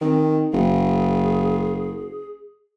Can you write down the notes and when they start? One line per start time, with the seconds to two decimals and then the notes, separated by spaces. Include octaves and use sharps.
0.01 D#3 C4
0.53 F#1 G#4